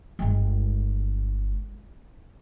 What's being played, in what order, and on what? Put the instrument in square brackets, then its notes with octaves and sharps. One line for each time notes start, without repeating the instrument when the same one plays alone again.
[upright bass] G1 G#3